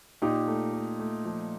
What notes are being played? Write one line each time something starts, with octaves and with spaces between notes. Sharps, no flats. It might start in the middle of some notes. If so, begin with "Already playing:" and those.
A#2 D#4 G4
A3
A3
A3
F3